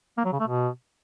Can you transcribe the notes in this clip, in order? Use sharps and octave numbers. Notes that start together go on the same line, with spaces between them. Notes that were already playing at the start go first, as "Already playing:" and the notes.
A#3
F#3
C#3
A3
B2